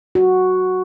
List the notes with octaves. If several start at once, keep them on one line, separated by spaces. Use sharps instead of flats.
F#4